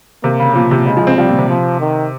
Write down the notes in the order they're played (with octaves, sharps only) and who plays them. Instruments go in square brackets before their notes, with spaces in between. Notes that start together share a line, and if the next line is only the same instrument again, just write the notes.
[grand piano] C3 [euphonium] A#3
[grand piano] C#3
[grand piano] A#2 [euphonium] F3
[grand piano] C3
[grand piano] C#3 [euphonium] G#3
[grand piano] F3
C4
[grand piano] F3 [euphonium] G3
[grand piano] A#2
C3
[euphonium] F3
D#3